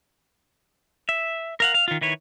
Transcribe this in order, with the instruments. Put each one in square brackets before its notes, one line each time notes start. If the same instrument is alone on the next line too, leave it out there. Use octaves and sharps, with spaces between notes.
[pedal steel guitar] E5
A#4 F5 F#5
F5
D#3 F4
D#3 E4 B4 C#5